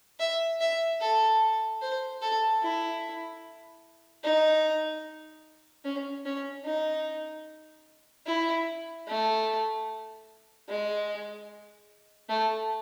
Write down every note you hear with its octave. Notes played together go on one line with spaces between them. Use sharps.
E5
E5
A4
C5
A4
E4
D#4
C#4
C#4
D#4
E4
A3
G#3
A3